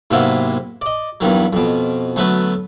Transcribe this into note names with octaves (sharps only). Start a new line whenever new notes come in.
G#2 C3 F#3 A#3 B3 E4
D5 D#5
E2 G2 D#3 F#3
F2 B2
D2 F#3 A3 B3 B4